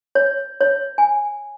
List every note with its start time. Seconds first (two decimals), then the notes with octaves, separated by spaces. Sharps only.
0.15 C#5
0.61 C#5
0.98 G#5